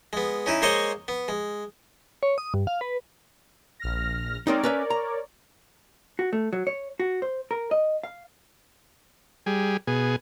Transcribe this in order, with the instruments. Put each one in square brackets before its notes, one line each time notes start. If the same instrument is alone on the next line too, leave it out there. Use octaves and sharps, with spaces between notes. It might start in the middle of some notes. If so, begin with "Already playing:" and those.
[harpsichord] G#3 B3
C#4 D#4 E4
G#3 A#3 C5 C#5 D#5 C#6
B3
G#3
[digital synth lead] C#5
D#6
G2
F5
B4
[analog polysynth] A#1 F6 A#6
[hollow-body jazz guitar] G#3 C4 D#4 [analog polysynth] A#4 C#5 D5
[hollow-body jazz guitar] C#4 B4 E5
A#5
F#4
A3
F#3
C#5
F#4
C5
A#4
D#5
F5
[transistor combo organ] G3 G#4
B2 G#4